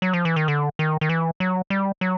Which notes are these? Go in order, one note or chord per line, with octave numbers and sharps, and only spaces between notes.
F#3
F3
E3
D#3
D3
D#3
D#3
E3
F#3
G3
F#3